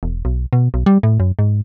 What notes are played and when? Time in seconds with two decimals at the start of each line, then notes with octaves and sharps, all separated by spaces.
0.03 E1
0.25 B1
0.53 B2
0.74 B1
0.86 G3
1.03 A2
1.20 F#2
1.39 G#2